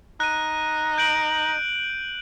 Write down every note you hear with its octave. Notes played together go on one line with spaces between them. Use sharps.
D#4 F#6 D#7
G6 D7 F#7